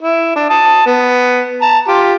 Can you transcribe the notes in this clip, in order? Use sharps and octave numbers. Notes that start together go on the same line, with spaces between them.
E4
D4
A5 D#6
B3
A5 A#5
F4 G4